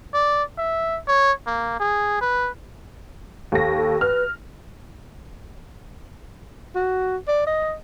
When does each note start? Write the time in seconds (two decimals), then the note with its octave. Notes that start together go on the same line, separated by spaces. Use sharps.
0.14 D5
0.58 E5
1.07 C#5
1.47 A#3
1.80 G#4
2.21 B4
3.52 D#2 A4 A#6
3.77 A4
4.01 B4 F6
6.75 F#4
7.28 D5
7.47 D#5